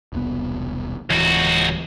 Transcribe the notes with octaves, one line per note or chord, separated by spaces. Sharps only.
E1 C2 B3
D1 C#2 E3 F#4